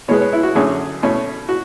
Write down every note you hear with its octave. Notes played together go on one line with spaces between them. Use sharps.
B2 G#3 B3 C#5
C#5
E4
F#4
F#2 D3 A3 C#4 G#4
B2 A3 C#4
F#4